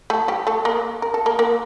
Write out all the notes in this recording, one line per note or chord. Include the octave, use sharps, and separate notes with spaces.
A3 A4
G3 G4
A3 A4
A#3 A#4
A#4
A4
A#3 A#4
A#3 A#4